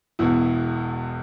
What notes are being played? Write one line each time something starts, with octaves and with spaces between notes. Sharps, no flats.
E1 E2 B2 E4